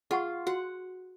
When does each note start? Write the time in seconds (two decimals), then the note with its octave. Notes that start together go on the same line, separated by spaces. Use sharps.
0.11 F4 G#4 F#5 C#6
0.47 F#4 F#5